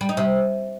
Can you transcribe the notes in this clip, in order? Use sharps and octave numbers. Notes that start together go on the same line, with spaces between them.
G3
D#4
C3